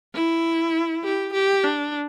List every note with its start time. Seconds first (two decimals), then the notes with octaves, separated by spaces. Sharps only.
0.14 E4
1.04 G4
1.33 G4
1.63 D4